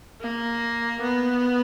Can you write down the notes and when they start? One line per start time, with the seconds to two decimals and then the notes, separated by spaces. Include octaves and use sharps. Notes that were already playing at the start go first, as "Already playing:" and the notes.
0.21 A#3
1.02 B3